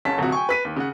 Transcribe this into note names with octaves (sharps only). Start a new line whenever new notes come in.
F#1 C#2 C#4 A5 B6
D1 C3 F#4
G5 G#5 C#6
B4 B6 D#7
D#2
C#3 F#5